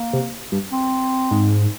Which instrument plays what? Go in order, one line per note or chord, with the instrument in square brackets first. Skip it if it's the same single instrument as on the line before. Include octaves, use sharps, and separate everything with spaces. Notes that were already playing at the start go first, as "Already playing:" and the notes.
Already playing: [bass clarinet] A#3
[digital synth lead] C3
G2
[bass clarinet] C4
[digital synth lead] G#2